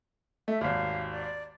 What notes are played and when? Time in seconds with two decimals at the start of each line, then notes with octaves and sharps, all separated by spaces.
0.48 A3 E5
0.61 G#1 D#2 F5
1.11 D5